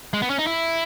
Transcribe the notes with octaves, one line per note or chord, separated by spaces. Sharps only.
G#3
B3
C#4
D#4
E4